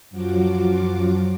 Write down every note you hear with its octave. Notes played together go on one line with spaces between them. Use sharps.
F#2 F3 F#3 F4 F#4 D6